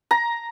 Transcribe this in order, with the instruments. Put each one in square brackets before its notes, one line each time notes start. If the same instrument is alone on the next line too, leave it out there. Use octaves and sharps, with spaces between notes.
[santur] A#5